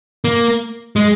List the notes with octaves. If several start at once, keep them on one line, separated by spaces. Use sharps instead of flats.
A#3
G#3